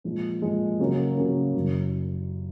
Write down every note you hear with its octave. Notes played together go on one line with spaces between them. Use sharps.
A#2 F3 G#3
A#2 F3 G#3
C#3 F#3 A#3 C#4
C#3 F#3 A#3 C#4
F#1 F#2 D#3 F#3